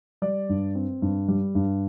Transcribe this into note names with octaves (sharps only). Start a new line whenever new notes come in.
G3 D5
G2
C4
G2
G3
G2